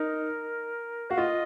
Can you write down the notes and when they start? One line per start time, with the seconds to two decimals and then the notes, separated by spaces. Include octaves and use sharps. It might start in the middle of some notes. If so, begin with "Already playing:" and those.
Already playing: D#4 A#4
1.10 F#4 F5
1.18 F4 D#5